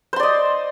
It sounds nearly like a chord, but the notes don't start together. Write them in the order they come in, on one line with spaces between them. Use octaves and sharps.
C5 C6 D5 D#5